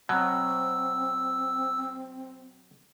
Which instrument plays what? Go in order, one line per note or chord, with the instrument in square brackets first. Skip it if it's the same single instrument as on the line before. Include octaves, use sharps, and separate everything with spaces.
[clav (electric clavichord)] B2 F#3 [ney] C4 [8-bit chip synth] E6